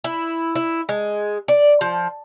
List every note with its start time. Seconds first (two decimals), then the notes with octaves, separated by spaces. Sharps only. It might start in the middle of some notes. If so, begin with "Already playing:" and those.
0.04 E4
0.55 E4
0.89 G#3
1.48 D5
1.81 F3